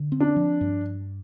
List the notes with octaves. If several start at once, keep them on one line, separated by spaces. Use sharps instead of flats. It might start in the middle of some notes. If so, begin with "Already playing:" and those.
Already playing: D3
C4
D4
F3
G2